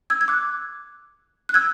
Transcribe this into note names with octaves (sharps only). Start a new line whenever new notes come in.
E6 G#6
G#6
D6 F#6
F#6
E6 G#6